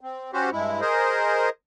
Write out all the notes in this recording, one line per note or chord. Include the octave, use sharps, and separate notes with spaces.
C4
C#4 F#4 G4 C5
G2 G#3 E4
G#4 A#4 C5 D#5